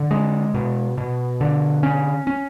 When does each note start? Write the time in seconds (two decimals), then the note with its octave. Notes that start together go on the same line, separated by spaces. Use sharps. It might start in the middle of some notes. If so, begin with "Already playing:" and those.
Already playing: D3
0.11 G#3
0.54 B2
0.98 B2
1.41 D3
1.83 C#4
2.27 C#4